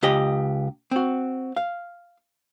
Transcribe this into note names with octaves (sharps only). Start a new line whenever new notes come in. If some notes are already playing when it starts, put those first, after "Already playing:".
C#2 G4 D#5
C4 F#4
F5